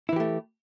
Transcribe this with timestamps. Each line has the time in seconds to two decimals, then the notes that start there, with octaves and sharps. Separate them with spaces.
0.09 E4
0.13 E3
0.16 G4
0.20 A3